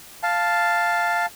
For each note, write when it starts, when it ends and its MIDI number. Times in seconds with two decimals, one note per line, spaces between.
0.23 1.26 77
0.23 1.26 81